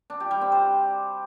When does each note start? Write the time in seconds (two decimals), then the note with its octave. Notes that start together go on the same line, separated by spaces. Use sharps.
0.10 D4
0.20 G4
0.31 G3
0.41 C4
0.52 C5